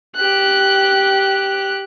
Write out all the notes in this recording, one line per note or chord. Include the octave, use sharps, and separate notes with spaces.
G4 F#6